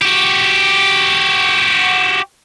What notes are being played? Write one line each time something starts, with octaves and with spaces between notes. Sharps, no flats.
F#4 G4